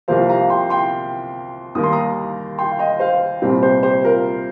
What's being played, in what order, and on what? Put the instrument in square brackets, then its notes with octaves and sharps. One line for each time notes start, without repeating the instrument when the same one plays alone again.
[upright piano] C2 C3 F3 A#3 C5 F5
F5 A#5
G5 C6
G5 C6
D#2 D#3 G3 A#3 D#6
C6
A#5 D#6
G5 C6
F5
D#5 G5
C5 F5
C2 A#2 G3 C4 G4
G4 C5
G4 C5
F4 A#4